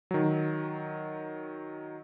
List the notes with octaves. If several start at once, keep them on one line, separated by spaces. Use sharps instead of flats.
D#3 F#3